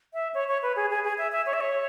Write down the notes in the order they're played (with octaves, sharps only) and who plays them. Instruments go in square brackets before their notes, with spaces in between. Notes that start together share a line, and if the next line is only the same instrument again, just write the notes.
[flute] E5
C#5
C#5
B4
G#4
G#4
G#4
E5
E5
C#5
E5
C#5